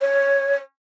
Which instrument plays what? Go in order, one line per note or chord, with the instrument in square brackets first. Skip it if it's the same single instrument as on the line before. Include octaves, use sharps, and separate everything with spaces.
[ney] C#5